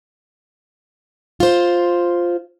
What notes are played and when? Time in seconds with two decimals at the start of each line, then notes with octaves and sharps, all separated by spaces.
1.40 F4 C5